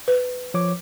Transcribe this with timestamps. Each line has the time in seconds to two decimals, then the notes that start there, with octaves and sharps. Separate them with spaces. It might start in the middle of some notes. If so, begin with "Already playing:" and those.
0.08 B4
0.54 F3 C#5 D6